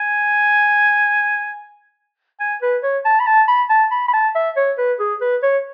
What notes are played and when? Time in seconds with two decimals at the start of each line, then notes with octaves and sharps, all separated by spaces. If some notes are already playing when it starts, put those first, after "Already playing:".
Already playing: G#5
2.40 G#5
2.62 B4
2.83 C#5
3.05 A5
3.20 B5
3.27 A5
3.48 B5
3.70 A5
3.91 B5
4.08 B5
4.13 A5
4.35 E5
4.57 C#5
4.78 B4
4.99 G#4
5.21 B4
5.43 C#5